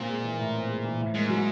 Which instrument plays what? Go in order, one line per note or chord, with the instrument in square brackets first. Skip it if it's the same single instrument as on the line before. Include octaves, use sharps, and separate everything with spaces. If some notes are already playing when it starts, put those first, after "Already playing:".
Already playing: [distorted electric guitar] A#2 [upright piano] C4
[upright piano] G#3
E3
A2
C4
G#3
E3
A2
[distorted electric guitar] G#2 [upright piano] A#3
[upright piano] F#3